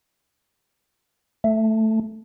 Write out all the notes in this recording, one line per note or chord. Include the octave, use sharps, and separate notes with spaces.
A3